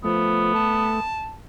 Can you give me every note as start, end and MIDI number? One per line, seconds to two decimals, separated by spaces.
0.04 0.54 53
0.04 1.00 57
0.04 1.03 59
0.55 1.34 81